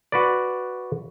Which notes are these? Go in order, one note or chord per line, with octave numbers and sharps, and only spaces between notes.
F#4 B4 D5